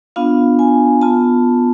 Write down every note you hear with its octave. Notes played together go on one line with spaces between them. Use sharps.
B3 D4 F4 F5
G#5
B3 F4 A5